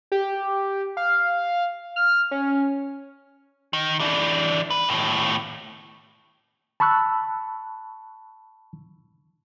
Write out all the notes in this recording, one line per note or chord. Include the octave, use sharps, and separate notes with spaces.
G4
F5
F6
C#4
D#3
E3 D4
B4
D#2 A2
A5 B5 C#6 E6 F#6